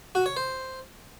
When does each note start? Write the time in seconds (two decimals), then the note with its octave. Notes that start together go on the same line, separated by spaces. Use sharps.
0.15 F#4
0.26 C#5
0.37 C5